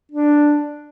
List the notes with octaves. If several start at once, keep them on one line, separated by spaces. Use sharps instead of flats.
D4